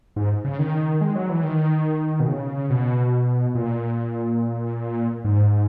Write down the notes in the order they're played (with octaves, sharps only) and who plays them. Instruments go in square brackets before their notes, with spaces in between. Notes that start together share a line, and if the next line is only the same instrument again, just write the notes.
[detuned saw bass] G#2
C#3
D#3
G#3
F#3
E3
D#3
B2
C#3
B2
A#2
G#2